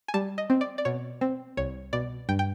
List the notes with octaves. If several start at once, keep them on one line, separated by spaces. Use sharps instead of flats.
G#5
G3 A5
D#5
C4
D5
D5
B2 C#5
C4
C2 C#5
B2 D5
G2 G5
G5